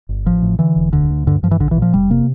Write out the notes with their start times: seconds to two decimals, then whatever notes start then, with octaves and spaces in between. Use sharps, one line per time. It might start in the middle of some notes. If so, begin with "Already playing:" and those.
0.09 G1
0.26 A1 F3
0.42 A2
0.59 D3 E3
0.76 E1
0.93 D2 D3
1.10 D2
1.27 G2 D3
1.43 G2 F3
1.51 E3
1.60 A#1 D3
1.71 E3
1.77 A#2
1.82 F3
1.94 F1 G3
2.10 C3 A#3